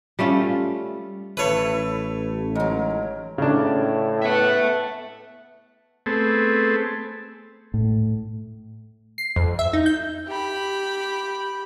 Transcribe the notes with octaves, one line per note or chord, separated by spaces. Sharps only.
G3 A3 C#4 F4
A1 A3 E4 A4 B4 C#5
G#2 F#3 A#4
A2 C#3 D4
B3 E5 F#5 A5
A3 B3 C4 G#4 A4
A2
C7
F2
E5
D#4
G6
G4 B5